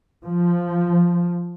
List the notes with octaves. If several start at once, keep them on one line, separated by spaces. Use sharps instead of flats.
F3